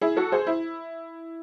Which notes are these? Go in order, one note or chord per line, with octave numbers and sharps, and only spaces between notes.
E4 G#4
F#4 A4
G#4 C5
E4